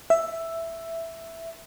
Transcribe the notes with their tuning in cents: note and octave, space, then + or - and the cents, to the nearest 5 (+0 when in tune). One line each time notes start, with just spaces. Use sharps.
E5 +5